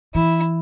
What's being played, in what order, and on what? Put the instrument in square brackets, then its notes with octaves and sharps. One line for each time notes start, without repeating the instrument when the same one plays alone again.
[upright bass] E3 [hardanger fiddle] E4